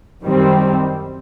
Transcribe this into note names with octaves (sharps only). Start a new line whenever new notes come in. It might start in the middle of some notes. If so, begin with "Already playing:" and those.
F#2 D#3 G3 C4